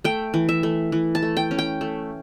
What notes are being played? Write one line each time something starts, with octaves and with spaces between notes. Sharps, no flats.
A3 G5
E3
E5
A3
E3
A5
A3
G5
C#4
G5
A3